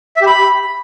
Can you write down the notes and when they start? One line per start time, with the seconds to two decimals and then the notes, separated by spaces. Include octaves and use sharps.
0.16 E5
0.22 G4
0.27 B5